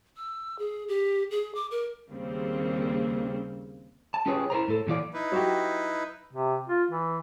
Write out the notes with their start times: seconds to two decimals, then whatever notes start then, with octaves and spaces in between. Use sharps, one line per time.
0.17 E6
0.59 G#4
0.88 G4
1.31 G#4
1.55 D6
1.71 A#4
2.09 D#2 C#3 G3 A#3 C4
4.14 A5
4.26 C#4 F4 G4 G#4 B4 C#5
4.50 E4 A#4 C5 A#5
4.68 A2 A4
4.87 A#2 E3 F4 D5
5.14 D#4 E4 B4
5.32 F#3 F#4 G4
6.33 C3
6.68 F4
6.91 E3